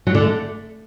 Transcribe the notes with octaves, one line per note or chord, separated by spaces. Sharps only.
F#3
D3
A3